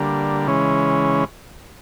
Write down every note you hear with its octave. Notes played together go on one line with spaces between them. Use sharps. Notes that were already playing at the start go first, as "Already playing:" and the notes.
Already playing: D3 G3 A#3
C#3 E3 G#3 C#4